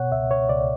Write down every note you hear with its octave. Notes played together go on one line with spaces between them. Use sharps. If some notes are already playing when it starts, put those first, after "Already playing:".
Already playing: B2 C#5 F#5
C#2 E5
C#5
C#2 D5